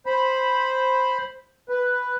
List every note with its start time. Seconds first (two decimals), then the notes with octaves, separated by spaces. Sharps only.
0.06 C5 B5
1.69 B4